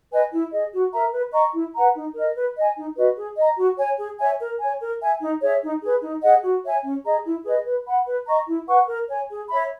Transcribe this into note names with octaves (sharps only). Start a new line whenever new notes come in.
B4 D#5 G#5
E4
G#4 D#5
F#4
A#4 E5 A#5
B4
D#5 A#5 C#6
E4
B4 F#5 A#5
D#4
A#4 D#5
B4
D#5 G#5
D#4
F#4 B4 D#5
G#4
D#5 A#5
F#4
C#5 G#5
G#4
C#5 E5 G#5
A#4
C#5 G#5
A#4
E5 G#5
D#4
G#4 C#5 E5
D#4
G#4 B4
D#4
G#4 D#5 F#5
F#4
C#5 E5 G#5
C#4
G#4 D#5 A#5
E4
G#4 B4 D#5
B4
F#5 B5
B4
D#5 A#5 C#6
E4
B4 F#5 C#6
A#4
C#5 G#5
G#4
C#5 E5 B5